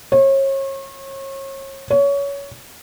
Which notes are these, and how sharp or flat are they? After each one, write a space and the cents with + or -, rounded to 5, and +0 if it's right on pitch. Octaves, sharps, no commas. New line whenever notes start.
C#5 -35
C#5 +20